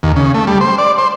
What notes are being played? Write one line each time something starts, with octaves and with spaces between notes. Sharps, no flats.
D#2
C#3
A3
G3
C5
D5
C5